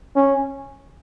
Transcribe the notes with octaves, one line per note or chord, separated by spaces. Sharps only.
C#4